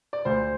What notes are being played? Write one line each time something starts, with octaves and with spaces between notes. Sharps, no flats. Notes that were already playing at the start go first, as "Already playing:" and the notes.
D5
D2 C5